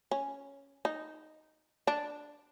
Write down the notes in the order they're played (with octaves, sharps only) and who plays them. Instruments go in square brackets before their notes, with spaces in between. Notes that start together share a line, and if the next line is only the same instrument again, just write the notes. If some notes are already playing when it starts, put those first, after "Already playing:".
[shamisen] C#4
D#4
D4